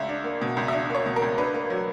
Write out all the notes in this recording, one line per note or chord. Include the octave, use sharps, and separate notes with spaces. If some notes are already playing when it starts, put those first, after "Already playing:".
Already playing: C#2 E5
D4
A#3
B2
C#2
E5
D4 D5
A#3 C#5
B2
A#4
C#2
D4 B4
A#3
F#3